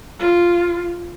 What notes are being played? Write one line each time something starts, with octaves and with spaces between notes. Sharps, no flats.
F4